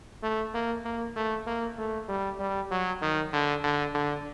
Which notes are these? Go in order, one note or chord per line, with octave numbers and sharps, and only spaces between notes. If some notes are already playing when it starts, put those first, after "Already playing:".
A3
A#3
A#3
A3
A#3
A3
G3
G3
F#3
D#3
D3
D3
D3